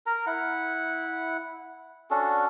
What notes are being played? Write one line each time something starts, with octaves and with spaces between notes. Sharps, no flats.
A#4 A#5
E4 F#5
C#4 D4 F#4 A4